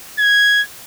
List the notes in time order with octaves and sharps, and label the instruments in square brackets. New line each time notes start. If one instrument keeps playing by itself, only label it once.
[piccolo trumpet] G#6